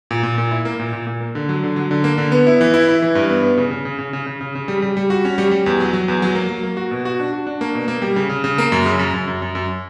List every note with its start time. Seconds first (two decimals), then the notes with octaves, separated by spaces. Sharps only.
0.11 A#2
0.23 A#2
0.38 A#2
0.51 E4
0.65 A#3
0.79 A#2
0.93 A#2
1.07 A#2
1.21 A#3
1.35 D3
1.49 F#3
1.63 D3
1.76 F#3
1.91 D3
2.04 A#3
2.18 D3
2.32 B3
2.47 E4
2.61 E3
2.74 E4
2.89 E4
3.02 E3
3.15 G2
3.30 B3
3.43 B3
3.57 C#3
3.71 C#3
3.85 C#3
3.99 C#3
4.13 C#3
4.26 C#3
4.41 C#3
4.55 C#3
4.68 G3
4.82 G3
4.97 G3
5.10 F#4
5.25 C#4
5.38 G3
5.51 G3
5.66 E2
5.80 F#3
5.93 F#3
6.08 E2
6.22 F#3
6.35 A#3
6.49 F#3
6.63 A#3
6.77 F#4
6.91 B2
7.05 F#4
7.20 D4
7.33 F#4
7.47 D4
7.61 A#3
7.75 B2
7.88 A#3
8.02 G3
8.16 C#3
8.30 C#3
8.44 C#3
8.58 A#3
8.72 F#2
8.85 C#3
8.99 F#2
9.14 F#2
9.28 F#2
9.42 F#2
9.55 F#2